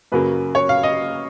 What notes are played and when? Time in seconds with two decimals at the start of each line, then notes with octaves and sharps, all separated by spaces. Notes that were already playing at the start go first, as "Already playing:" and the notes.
0.12 F#2 C#3 F#3 A#3 B4
0.55 C#5
0.69 F5
0.83 D#5